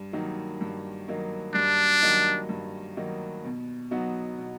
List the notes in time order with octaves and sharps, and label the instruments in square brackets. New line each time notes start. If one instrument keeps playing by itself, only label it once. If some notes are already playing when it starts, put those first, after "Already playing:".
Already playing: [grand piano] G2
D#3 F#3 A#3 D#4
G2
D#3 F#3 A#3 D#4
[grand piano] G2 [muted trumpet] D4
[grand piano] D#3 F#3 A#3 D#4
G2
D#3 F#3 A#3 D#4
B2
F#3 B3 D#4 F#4
B2